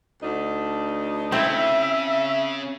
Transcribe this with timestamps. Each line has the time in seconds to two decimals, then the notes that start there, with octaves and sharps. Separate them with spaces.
0.22 D2 D4 D#4
1.32 C#3 C4 E4 E5